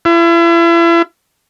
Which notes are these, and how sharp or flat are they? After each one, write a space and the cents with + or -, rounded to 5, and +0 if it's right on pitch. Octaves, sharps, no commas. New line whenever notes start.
E4 +40